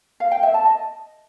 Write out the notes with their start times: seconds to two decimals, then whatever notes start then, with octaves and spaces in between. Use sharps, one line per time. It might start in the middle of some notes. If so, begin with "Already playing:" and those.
0.20 F5
0.32 G5
0.43 E5
0.54 A5
0.65 D#5